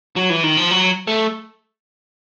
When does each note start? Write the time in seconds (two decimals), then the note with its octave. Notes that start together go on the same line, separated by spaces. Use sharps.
0.16 F#3
0.30 E3
0.43 D#3
0.57 F3
0.71 F#3
1.07 A3